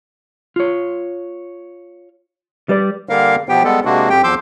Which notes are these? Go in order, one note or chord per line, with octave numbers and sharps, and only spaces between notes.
F4 C#5
G3 B4 D5
D3 G3 A#3 A#4 F5
B2 F3 B3 G4 G5
G3 G#3 B3 A4
C3 G#3 A#3 D4 F#4
F2 G4 G5
E2 F3 C6 D6 E6 G6